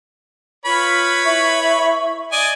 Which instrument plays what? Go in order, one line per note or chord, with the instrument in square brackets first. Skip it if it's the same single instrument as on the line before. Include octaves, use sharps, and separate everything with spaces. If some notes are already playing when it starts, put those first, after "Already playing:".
[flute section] F4 [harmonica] B4 C#5 B5
[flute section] E4 E5 C#6
[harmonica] D5 D#5 G#5